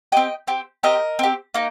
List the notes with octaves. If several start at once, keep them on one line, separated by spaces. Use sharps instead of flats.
C4 G4 D#5 G5
C4 G4
C4 G4 A#4 D#5
C4 G4
A#3 D#4